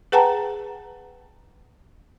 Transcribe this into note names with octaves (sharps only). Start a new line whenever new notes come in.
G#4 B4 F#5 G5 A5 A#5